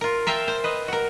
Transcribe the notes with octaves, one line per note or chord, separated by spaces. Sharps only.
F4 A#4
A#4 E5 F5 G5 A5
C5
B4 D#5
F#4 A#4